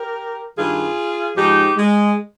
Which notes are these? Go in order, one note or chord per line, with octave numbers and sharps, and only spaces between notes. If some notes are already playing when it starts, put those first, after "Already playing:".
Already playing: G4 A#4
G2 D#3 F4 G#4
G#2 F3 D#4 G4
G#3